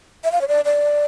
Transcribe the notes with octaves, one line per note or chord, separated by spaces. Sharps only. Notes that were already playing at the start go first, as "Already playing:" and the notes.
E5
F5
C#5
D5
D5